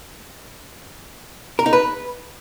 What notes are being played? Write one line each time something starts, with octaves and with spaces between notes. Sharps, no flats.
A#4
D#4
B4